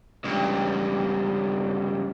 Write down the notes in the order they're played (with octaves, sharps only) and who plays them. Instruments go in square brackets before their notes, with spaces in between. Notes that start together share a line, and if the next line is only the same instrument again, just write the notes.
[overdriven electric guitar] C#2 G2